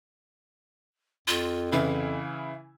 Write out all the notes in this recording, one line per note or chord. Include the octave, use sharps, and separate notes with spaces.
F2 F4
C#3 E3 E4 F5